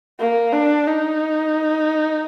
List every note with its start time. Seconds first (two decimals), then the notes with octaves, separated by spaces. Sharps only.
0.20 A#3
0.53 D4
0.87 D#4